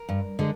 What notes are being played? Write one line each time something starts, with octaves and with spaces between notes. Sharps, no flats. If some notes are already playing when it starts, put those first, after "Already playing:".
Already playing: A#4
G2
D3 G#3